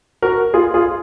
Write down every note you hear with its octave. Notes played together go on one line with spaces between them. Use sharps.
F#4 A#4
F4 G#4
F4 G#4